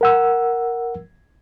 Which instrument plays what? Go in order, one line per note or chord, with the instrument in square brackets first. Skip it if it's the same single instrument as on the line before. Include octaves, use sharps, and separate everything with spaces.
[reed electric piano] A#4 F#5 E6